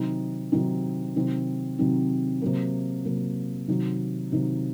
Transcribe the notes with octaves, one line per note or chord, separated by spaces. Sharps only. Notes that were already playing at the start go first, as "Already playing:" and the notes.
Already playing: C3 D#3 F#3 C4 D#4
C3 D#3 F#3 C4 D#4
C3 D#3 F#3 C4
C3 D#3 F#3 C4
C3 F#3 A#3
C3 F#3 A#3
C3 D#3 F#3
C3 D#3 F#3